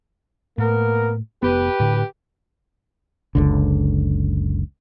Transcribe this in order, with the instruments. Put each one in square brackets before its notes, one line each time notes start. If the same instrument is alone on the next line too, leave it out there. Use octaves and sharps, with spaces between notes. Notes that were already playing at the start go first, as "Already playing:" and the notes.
[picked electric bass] A2 [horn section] A#3 B3 A#4
[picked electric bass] F1 B3 [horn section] G4 B4
[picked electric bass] A2 D3
[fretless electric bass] F#1 C#2 D3